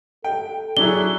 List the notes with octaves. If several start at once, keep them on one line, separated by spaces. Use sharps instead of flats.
A4 G5
F#3 D4 E4 G#4 G7